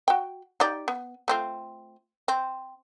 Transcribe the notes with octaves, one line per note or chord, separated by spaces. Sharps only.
F#4 G5
D#4 G4 D5
B3
A3 C4 F4
C4